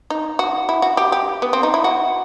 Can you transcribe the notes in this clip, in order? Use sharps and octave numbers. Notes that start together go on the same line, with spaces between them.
D#4
F#4
E4
F#4
G4
G4
B3
C4
D#4
E4
F#4